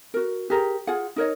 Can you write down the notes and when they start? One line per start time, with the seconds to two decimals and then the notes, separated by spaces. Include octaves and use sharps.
0.14 F#4 A#4
0.50 G4 G#4 A#4 A#5
0.87 F4 G#4 F#5
1.16 D#4 A#4 C#5 D#5